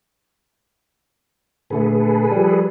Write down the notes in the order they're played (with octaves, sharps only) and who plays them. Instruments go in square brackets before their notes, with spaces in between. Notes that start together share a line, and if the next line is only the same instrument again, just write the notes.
[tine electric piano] A#2 D3 A3 [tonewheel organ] G#4 A4 B4
[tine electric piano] F3 G3